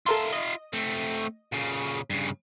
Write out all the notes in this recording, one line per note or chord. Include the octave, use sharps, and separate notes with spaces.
F4 A4 A#4 E5 C6
D#5
A3 C4
A#2 C#3
G2 C#3